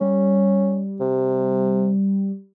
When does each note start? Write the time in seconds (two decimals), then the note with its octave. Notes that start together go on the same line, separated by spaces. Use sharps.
0.01 G3 C#4
1.00 C3